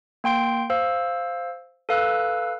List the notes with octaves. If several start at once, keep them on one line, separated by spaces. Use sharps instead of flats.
A#3 G5 C6 D7
C5 F5 E6
A4 B4 F5 E6 F#6